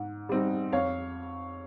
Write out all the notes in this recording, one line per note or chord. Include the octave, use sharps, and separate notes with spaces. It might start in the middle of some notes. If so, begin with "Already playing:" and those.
Already playing: G#2
G3 C4 D#4
F2 C#5 F5